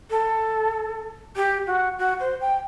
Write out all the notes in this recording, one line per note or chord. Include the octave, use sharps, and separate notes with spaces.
A4
G4
F#4
F#4
C5
G5